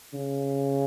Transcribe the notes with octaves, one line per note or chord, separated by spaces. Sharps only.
C#3